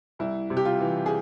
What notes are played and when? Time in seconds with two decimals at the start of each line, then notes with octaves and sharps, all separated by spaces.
0.19 C2 E4
0.50 C3
0.57 G4
0.65 F4
0.81 E3
1.06 G#4